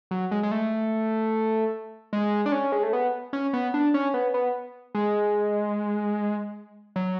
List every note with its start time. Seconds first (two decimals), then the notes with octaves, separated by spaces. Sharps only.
0.11 F#3
0.31 G#3
0.43 G#3
0.51 A3
2.13 G#3
2.46 D4
2.52 C#4
2.72 G#3
2.83 A3
2.93 B3
3.33 C#4
3.53 B3
3.74 D4
3.94 C#4
4.14 B3
4.34 B3
4.95 G#3
6.96 F#3